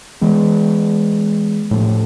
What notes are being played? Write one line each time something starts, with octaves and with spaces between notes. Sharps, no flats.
E3 G#3 B3
A2 F3